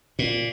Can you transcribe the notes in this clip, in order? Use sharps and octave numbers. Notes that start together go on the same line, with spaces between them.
A#2